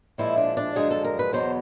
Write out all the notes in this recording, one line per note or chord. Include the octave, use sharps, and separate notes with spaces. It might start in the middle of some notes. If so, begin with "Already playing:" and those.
A#2 F3 G#3 E4
D4
D4
F#2 D3 F3 G#3 G#4
A4
A#4
B4
E2 B2 F#3 C5